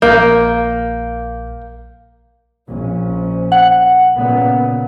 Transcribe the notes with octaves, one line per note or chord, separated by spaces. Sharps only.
A#1 A#3 G6
A#1 C#4
F#5
A#2 C#3 B3